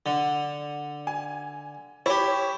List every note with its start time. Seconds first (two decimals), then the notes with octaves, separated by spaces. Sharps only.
0.06 D3
1.07 G#5
2.06 E4 G4 C#5